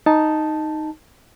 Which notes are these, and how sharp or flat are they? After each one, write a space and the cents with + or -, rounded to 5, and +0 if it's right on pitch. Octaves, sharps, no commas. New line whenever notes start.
D#4 +0 A5 +0